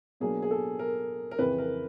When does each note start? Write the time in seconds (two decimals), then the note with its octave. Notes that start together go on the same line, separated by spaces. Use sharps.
0.20 B2 F#3 A#3 D4 G#4
0.42 G#4
0.51 A4
0.79 A#4
1.31 A#4
1.38 F2 C#3 E3 B4
1.58 A#4